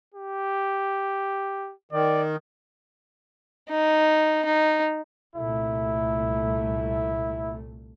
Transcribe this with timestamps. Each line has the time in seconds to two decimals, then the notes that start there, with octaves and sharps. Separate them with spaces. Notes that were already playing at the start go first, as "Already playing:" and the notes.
0.14 G4
1.92 D#3 D5
3.70 D#4
4.45 D#4
5.35 C2 A#2 A3 E4